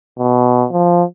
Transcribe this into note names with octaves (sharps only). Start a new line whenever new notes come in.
B2
F3